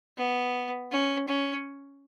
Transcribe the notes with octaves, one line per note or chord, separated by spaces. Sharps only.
B3
C#4
C#4